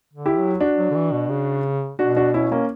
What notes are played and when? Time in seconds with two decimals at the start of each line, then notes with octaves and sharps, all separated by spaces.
0.13 D3
0.26 E4 G4
0.37 F#3
0.60 D4 F#4
0.78 F#3
0.91 D3
0.95 E3
1.12 B2
1.30 C#3
1.99 B2 D4 F#4
2.16 D4 F#4
2.34 C#4 E4
2.51 A#3 C#4